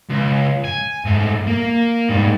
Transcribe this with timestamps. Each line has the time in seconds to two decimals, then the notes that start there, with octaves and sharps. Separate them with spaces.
0.10 C#2
0.64 G#5
1.05 G#2 A3
1.47 A#3
2.09 G#2 G3